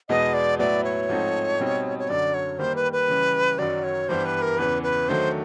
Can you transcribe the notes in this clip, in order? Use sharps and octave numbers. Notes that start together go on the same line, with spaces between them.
E2 B2 G#3 B3 D#5
D5
A2 F#3 B3 E4 D5
C#5
G#2 F3 A3 C4 D#4
B2 G3 C4 D#4
C#5
F#2 D3 F#3 D5
C#5
D#3 G3 A#3 C5
B4
B4
C#3 E3 G3
F#2 D#3 F#3 D5
C#5
G2 E3 G3 B3 C5
B4
A#4
E2 C#3 E3 B4
B4
D#3 F#3 A3 D4 C5